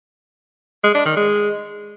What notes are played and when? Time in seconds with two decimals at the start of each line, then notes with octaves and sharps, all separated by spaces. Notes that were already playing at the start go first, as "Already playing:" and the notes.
0.84 G#3
0.95 D4
1.06 D#3
1.17 G#3